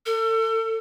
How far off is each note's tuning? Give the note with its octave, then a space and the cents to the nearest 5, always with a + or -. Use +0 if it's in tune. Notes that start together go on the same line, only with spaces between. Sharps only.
A4 +35